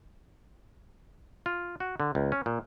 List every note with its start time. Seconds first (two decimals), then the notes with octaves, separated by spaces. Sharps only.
1.46 F4
1.80 F#4
2.00 D3
2.15 C#2
2.32 C#4
2.46 A#2